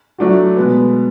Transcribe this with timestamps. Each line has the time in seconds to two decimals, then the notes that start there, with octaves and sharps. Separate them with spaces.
0.18 F#3 A3 D4 F#4
0.56 B2 G#3 B3